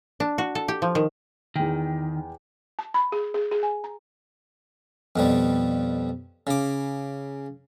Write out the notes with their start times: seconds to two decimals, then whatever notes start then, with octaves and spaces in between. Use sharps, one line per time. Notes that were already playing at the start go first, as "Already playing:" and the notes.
0.20 D4
0.38 F#4
0.55 A4
0.68 G4
0.82 F3
0.95 D#3
1.56 E2 D#3 G5
2.79 A5
2.94 B5
3.12 G#4
3.34 G#4
3.51 G#4
3.63 G#5
3.84 A#5
5.16 F2 B2 G3
6.47 C#3 D6